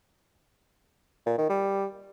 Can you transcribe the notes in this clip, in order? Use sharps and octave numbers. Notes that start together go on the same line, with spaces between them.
A#2
D#3
G3